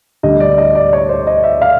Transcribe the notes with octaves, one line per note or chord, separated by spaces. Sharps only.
D2 D3 G3 D#5
D5
D#5
D5
C#5
C5
D#5
E5
F5